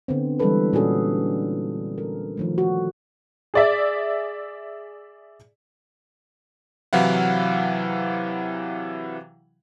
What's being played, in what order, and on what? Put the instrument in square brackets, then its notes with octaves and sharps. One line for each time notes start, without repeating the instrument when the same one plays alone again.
[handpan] D3 B3 C4
E3 G3 G#3 C4 A4 B4
A#2 C#4 D4 F#4 G#4 A4
A4 A#4
D#3 F3 A3
F#4
[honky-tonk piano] G#4 D5 E5
[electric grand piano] C3 E3 F#3 E4 F5 F#5